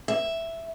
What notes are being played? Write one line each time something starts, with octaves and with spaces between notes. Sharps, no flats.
E5